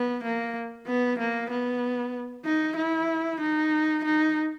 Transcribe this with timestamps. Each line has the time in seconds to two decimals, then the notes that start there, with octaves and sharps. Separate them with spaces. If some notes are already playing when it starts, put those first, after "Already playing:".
Already playing: B3
0.23 A#3
0.87 B3
1.19 A#3
1.50 B3
2.45 D#4
2.76 E4
3.40 D#4
4.04 D#4